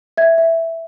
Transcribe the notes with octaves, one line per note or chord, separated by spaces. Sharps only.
E5 G#6
E5